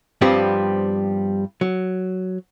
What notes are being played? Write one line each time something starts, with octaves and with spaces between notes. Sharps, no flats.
G2 F3 G3 B3 C4 G4
F#3